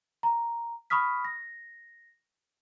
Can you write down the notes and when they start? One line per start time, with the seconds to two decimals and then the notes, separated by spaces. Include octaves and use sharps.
0.23 A#5
0.90 B5 C#6 D#6 F6 B6
1.25 A#6